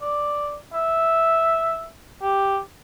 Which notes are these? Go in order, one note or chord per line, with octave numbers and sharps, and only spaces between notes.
D5
E5
G4